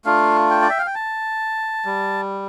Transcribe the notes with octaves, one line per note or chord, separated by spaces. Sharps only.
A3 D4 F4 F5
G5
D5
E5
F5
G5
A5
G3